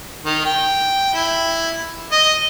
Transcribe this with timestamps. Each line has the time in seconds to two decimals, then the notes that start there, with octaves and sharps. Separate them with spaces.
0.24 D#3
0.45 G5
1.14 E4
2.12 D#5